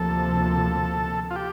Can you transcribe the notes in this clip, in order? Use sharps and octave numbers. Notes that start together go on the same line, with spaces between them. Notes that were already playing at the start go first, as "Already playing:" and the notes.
Already playing: D2 C3 F3 A#3 A4
F4
G4